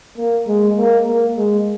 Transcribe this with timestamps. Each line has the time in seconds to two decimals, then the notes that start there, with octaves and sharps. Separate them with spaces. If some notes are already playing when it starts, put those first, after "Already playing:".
0.18 A#3
0.47 G#3
0.78 A#3
1.07 A#3
1.37 G#3